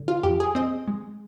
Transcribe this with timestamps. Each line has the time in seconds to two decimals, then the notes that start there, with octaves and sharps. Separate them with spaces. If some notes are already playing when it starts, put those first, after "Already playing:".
Already playing: D3
0.08 F4
0.23 F2 G4
0.40 G#4
0.55 C4 D#5
0.88 G#3